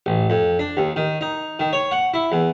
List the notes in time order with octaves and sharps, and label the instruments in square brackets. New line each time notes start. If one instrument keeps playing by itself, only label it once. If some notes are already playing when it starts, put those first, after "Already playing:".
[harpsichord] A1
F2
D4
D#2
D#3
D#4
D#3
C#5
F#5
E4
E2